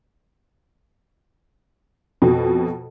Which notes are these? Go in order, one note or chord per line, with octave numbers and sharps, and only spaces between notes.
F2 B2